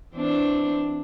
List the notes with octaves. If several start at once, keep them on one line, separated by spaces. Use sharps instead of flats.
E3 C4 D4